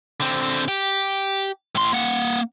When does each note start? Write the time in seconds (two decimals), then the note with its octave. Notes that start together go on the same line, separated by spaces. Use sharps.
0.20 D3 C4
0.68 G4
1.75 A2 C6
1.93 A#3 F#5